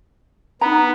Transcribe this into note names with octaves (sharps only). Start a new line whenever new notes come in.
B3 D#4 A#5